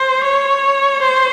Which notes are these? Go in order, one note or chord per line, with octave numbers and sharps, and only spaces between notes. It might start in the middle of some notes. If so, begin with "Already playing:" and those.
Already playing: C5
C#5
C5